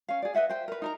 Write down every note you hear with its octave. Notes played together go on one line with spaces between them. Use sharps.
C#4 F5
G#4 D5
B4 D#5 E5 F#5
C5 G5
A#4 B4
D#4 A#4 A#5